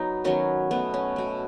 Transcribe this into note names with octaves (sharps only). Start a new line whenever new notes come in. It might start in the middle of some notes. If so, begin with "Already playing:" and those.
Already playing: F#3 B3 D#4
D#3 F#3 B3 C#4
B2 A3 B3
C#4
B2 A3